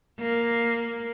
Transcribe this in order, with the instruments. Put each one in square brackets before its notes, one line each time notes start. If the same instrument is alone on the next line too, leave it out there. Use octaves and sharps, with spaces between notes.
[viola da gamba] A#3